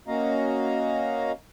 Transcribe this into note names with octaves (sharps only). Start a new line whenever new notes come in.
A#3 C#4 F#4 D#5 F5 A#5